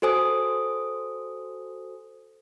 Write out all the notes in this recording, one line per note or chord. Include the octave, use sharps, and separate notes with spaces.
F#4 A4 C5 G#5 D#6